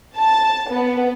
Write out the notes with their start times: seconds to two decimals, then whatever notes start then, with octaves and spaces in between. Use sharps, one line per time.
0.16 A5
0.69 B3